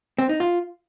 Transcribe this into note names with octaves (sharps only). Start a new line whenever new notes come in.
C4
D#4
F4